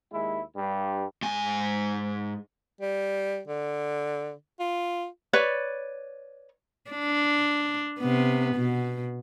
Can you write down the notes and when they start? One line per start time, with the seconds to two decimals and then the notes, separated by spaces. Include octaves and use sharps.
0.12 D#2 G#3 E4
0.55 G2
1.22 G#2 G#5
2.81 G3
3.47 D3
4.59 F4
5.33 B4 C#5 D5
6.91 D4
8.00 C3 B3
8.55 B2